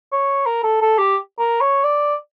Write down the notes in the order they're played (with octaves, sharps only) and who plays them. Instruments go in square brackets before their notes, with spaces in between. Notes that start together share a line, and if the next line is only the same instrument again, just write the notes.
[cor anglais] C#5
A#4
A4
A4
G4
A#4
C#5
D5